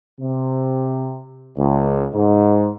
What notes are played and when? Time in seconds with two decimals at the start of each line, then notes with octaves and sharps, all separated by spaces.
0.20 C3
1.57 C#2
2.13 G#2